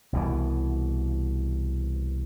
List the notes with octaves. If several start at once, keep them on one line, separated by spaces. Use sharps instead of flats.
C2 B2 E3